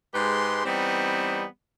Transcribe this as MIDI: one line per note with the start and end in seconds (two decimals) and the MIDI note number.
0.14 0.63 44
0.14 0.63 56
0.14 0.63 67
0.14 0.63 71
0.14 0.63 84
0.65 1.44 52
0.65 1.44 55
0.65 1.44 59
0.65 1.44 60
0.65 1.44 63